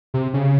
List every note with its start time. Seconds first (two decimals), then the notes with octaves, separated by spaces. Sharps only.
0.14 C3
0.34 C#3